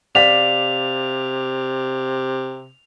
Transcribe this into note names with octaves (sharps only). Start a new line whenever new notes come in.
C3 D5 F5 B6 F7